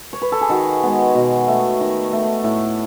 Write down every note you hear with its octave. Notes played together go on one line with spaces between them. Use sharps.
C#5
B4
A4
G#4
D#3 F#4
G#3 B3
B2
A3
D#3
A3
A2